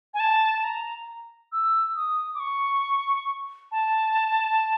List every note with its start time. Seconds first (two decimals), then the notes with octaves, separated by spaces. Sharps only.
0.14 G#5
0.20 A5
0.57 A5
0.64 A#5
1.52 E6
1.96 D#6
2.34 D6
2.40 C#6
3.72 A5